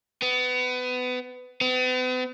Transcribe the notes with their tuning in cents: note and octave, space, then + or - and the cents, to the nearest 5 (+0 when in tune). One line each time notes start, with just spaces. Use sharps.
B3 +25
B3 +45